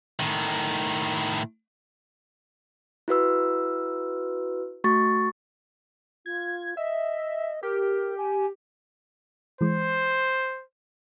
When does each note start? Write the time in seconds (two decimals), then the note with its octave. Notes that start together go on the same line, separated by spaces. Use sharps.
0.20 A2 D#3
3.08 E4 F#4 B4 E6
4.84 A3 F#4 C#6 A6
6.26 F4 G#6
6.77 D#5 E5
7.63 G4 A#4
8.18 G#5
9.61 E3 G#3 C5